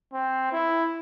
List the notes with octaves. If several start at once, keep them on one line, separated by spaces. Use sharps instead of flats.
C4
E4